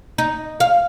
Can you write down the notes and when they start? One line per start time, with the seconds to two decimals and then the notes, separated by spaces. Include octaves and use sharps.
0.18 D#4
0.60 F5